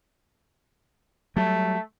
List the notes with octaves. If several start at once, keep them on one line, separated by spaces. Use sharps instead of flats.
F#3 G3 A3